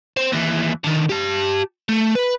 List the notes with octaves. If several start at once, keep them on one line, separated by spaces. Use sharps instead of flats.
C4
D#2 E3
D3 D#3
G4 A5
A3
B4